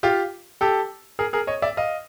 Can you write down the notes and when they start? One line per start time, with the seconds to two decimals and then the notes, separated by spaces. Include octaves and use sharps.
0.03 F4 G4
0.61 G4 A4
1.19 G#4 A#4
1.33 G#4 A#4
1.47 C#5 D#5
1.62 D5 E5
1.77 D#5 F5